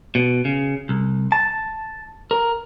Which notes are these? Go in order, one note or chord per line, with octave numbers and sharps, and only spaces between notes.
B2
C#3
C2
A5
A#4